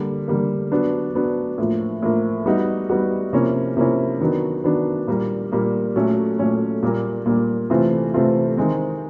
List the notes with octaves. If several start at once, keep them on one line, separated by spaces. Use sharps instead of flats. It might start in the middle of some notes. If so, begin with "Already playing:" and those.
Already playing: D3 G3 A#3
D3 G3 A#3
F#3 B3 D4
F#3 B3 D4
A2 F3 A#3
A2 F3 A#3
G3 B3 D#4 F#4
G3 B3 D#4 F#4
C3 F3 A#3 C#4 E4
C3 F3 A#3 C#4 E4
D#3 F#3 B3 D4
D#3 F#3 B3 D4
A#2 G3 A#3
A#2 G3 A#3
A#2 F#3 A3 C#4
A#2 F#3 A3 C#4
A#2 G3 A#3
A#2 G3 A#3
C3 E3 A3 C4 F4
C3 E3 A3 C4 F4
D#3 G#3 C4